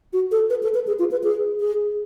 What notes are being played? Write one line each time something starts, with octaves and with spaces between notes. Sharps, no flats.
F#4
A4
B4
A4
B4
G#4
F4
B4
G#4
G#4